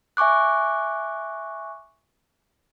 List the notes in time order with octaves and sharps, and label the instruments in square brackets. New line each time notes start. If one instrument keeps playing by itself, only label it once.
[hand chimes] E5 G#5 C#6 D6 F#6